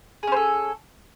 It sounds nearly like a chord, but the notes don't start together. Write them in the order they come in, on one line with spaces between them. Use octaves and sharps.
G#4 C#4 C5 A4